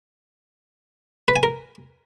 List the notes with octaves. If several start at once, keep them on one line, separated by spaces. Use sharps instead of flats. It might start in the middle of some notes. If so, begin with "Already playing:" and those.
B4
G#5
A#4